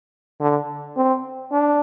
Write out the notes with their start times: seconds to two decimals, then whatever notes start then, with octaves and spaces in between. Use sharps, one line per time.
0.41 D3
0.97 C4
1.52 D4